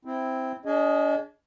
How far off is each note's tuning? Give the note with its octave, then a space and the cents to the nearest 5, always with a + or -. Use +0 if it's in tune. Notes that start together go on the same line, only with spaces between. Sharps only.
C4 +0 E4 +0
D4 -40 G#4 +0 D#5 +0